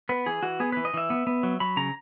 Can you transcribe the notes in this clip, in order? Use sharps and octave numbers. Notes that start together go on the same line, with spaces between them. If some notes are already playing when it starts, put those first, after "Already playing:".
B3 B4
E3 G#4
E3 F#4
B3 G#4
E3 B4
D#5
E3 E5
B3
B3
F#3
F#3 B5
C#3 A#5